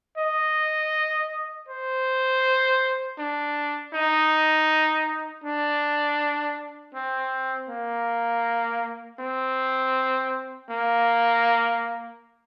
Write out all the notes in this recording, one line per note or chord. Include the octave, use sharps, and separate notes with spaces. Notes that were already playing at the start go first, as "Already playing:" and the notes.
D#5
C5
D4
D#4
D4
C4
A#3
C4
A#3